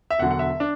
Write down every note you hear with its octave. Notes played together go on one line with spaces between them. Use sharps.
E5
E1 E2 D3 F#3 F#5
F#5
E5
D4